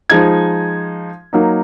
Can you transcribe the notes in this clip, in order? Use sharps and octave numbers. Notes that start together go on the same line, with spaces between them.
F3 G#3 D#4 G#6
F#3 A#3 D#4